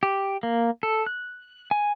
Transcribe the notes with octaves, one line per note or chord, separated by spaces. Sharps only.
G4
A#3
A4
F#6
G#5